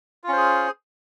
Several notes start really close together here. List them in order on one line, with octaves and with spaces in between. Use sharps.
F4 C#4 C5 G#4